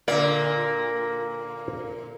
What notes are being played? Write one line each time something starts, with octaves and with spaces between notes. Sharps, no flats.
A#2 D3 A#3 D5